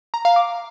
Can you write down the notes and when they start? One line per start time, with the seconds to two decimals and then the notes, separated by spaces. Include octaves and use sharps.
0.14 A#5
0.25 F5
0.36 D6